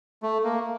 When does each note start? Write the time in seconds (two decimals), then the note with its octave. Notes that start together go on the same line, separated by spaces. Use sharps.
0.23 A3
0.44 A#3